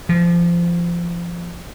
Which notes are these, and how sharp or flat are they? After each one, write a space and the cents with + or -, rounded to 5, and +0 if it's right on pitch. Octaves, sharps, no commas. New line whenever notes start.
F3 -20